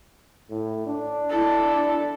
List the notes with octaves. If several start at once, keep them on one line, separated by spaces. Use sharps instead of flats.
A2
D4
E4 A4